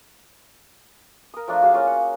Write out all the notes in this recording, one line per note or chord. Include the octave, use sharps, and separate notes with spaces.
A#4 D#6
F3 A3 D4 A#5
F#4 G#4 F5
A#3 C#4 F4 A#4
F#5